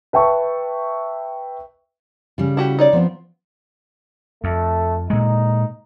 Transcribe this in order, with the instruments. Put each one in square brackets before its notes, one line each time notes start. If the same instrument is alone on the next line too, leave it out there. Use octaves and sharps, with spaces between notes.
[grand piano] B4 E5 G5 A5 C#6
[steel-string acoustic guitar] C#3 G3
[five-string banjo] E4 F#4 G4
D#4 C#5 D5
[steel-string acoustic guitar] F3 B3 C4
[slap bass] F2 [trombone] A3
[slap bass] A#2 G#3 [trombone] D#4